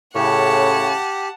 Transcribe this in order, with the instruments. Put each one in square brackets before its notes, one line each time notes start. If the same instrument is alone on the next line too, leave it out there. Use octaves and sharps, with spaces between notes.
[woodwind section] A2 C#3 [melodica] G4 [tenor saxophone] C#5 [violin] F#5 A5